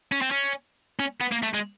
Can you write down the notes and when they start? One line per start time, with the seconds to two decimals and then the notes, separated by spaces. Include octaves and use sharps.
0.12 C#4
0.22 C4
0.31 C#4
0.99 C#4
1.21 B3
1.32 A#3
1.43 A3
1.54 G#3